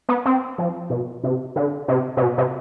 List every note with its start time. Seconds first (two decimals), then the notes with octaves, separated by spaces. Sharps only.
0.09 B3
0.25 C4
0.58 F3
0.90 B2
1.24 C3
1.56 D3
1.88 C3
2.17 C3
2.22 B2
2.38 C3